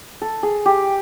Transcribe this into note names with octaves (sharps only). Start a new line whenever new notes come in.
A4
G#4
G4